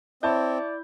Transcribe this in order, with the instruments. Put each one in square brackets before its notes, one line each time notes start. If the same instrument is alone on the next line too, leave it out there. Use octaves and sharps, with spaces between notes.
[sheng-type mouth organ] C4 [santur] E4 [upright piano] C#5 A5 G6 [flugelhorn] D5